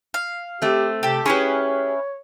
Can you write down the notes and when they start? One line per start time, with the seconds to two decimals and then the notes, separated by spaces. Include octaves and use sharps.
0.14 F5
0.62 A3 C4 G4
1.03 C3 G4 A4
1.26 C#4 E4 G4 G#4 B4 C#5